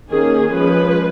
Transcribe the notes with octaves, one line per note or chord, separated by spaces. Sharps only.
D#3 A#3 C#4 G#4
F3 G#3 C#4 B4